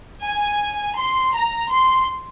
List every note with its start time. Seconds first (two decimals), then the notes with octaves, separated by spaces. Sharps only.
0.24 G#5
0.98 C6
1.35 A#5
1.71 C6